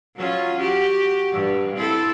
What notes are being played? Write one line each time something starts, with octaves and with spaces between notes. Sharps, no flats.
F#3 C#4 F4
F#4 G4
G2
C4 E4 A4